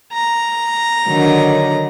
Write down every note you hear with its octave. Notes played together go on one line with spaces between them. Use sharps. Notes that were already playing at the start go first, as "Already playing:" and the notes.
A#5
D3 D#3 F#3